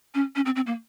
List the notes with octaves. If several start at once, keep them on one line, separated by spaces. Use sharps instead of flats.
C#4
C#4
C4
C4
A#3